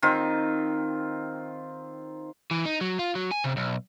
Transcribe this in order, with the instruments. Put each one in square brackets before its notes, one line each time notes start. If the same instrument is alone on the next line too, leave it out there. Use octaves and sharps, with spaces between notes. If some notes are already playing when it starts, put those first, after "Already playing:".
[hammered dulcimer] D#3 C4 F4
[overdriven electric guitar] E3
D#4
F#3
F4
F#3
G#5
C3
B1